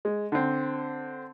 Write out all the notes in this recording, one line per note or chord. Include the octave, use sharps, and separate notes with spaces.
G#3
D3 C4